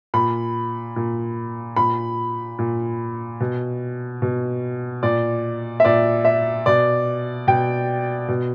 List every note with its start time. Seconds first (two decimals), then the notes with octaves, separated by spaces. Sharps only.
0.14 A#2 B5
0.96 A#2
1.76 A#2 B5
2.59 A#2
3.40 B2
4.22 B2
5.03 A#2 D5
5.80 E5
5.85 A#2 D5
6.25 E5
6.66 B2 D5
7.47 B2 G5
8.28 B2